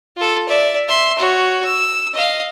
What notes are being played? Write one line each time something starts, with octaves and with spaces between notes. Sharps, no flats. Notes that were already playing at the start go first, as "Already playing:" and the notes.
F4 A4
D5 E5
E5 C6
F#4 C#5
E6
D#5 F5